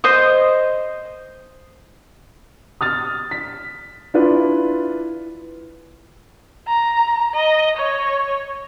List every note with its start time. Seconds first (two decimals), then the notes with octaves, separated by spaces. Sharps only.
0.04 C5 D#5 D#6
2.81 D#6 F6 A6
3.31 B6
4.14 D4 E4 F4 B4
6.67 A#5
7.34 D#5
7.77 C#5